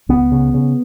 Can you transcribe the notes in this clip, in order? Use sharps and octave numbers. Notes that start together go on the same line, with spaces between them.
C#2 B3
C#3
C#3